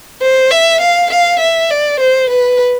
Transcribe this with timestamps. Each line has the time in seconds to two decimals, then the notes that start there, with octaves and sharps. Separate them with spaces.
0.22 C5
0.51 E5
0.81 F5
1.10 F5
1.40 E5
1.70 D5
2.00 C5
2.30 B4